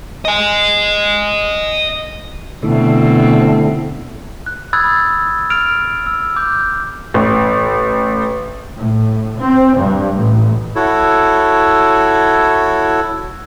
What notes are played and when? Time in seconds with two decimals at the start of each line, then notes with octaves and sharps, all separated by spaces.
0.25 D#5 G#5
2.63 B2 D3 A3 C4 E4
4.46 F#6
4.73 B5 D#6 E6 F#6 G#6 A6
5.19 E6
5.50 F6 D7 F7
6.07 E6
6.36 D6 G6
7.14 A1
8.76 A2
9.41 C4
9.77 G2
10.17 A1
10.76 E4 F#4 A4 C#5